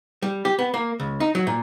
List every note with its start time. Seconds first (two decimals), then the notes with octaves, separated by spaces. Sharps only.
0.22 G3
0.45 G4
0.59 B3
0.74 A#3
1.00 C#2
1.20 D#4
1.35 F#3
1.47 A#2